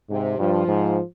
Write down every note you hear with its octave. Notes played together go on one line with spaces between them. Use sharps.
G#2 C3
G2 F3
G#2